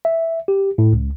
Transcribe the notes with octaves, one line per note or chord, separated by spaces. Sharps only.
E5
G4
A2
C#2